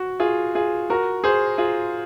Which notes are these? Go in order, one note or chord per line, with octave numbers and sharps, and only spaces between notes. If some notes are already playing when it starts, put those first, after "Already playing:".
Already playing: F#4
F4 G#4
F4 G#4
F#4 A#4
G#4 C5
F4 G#4